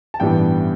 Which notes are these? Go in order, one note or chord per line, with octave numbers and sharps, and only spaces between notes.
A5
A1 G2 E3 G3 B3 G5